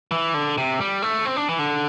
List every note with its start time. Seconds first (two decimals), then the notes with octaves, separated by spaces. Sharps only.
0.11 E3
0.34 D3
0.58 C3
0.80 G3
1.02 A3
1.25 C4
1.36 D4
1.49 E3
1.59 D3